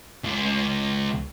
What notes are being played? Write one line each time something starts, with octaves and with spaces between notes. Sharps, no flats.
C#2